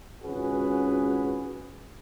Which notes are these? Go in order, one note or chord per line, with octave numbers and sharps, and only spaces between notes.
G#1 C#2 C#4 F#4 G#4 B4